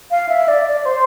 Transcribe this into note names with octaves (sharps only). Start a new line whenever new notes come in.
F5
E5
D5
D5
C5